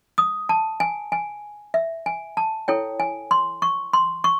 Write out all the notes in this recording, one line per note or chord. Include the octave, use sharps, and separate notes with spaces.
D#6
A5
G#5
G#5
E5
G#5
A5
E4 A4 C#5 G5
G#5
C6
C#6
C6
C#6